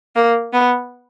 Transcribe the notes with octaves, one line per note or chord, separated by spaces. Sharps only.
A#3
B3